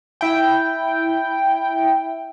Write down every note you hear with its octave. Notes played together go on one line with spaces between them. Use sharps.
E4 G5